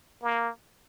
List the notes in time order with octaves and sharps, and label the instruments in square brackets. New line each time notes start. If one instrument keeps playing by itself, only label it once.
[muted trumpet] A#3